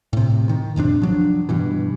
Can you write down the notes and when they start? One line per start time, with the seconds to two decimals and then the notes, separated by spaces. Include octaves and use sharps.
0.13 A2 C3
0.49 D#3
0.76 A1 F2 C3 D4
1.02 F3 F#3 D4
1.49 G2 B2 E3